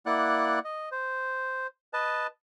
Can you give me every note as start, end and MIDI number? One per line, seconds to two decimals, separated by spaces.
0.06 0.59 58
0.06 0.59 64
0.06 0.59 74
0.06 0.59 78
0.06 0.59 90
0.64 0.89 75
0.92 1.67 72
1.93 2.27 71
1.93 2.27 75
1.93 2.27 81